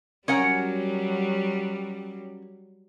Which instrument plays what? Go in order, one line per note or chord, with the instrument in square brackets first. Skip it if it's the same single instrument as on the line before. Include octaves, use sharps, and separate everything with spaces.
[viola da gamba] F#3 G3 [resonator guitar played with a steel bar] C#4 A#4 F#5